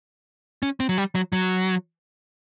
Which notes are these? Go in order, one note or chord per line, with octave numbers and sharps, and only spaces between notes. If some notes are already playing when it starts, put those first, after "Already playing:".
C#4
C4
F#3
G3
F#3
F#3